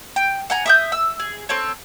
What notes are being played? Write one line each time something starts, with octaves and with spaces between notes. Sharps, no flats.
G5
F#5 G#5 A#5
E5 D#6 G6
E6
G#4
C4 A4 C#5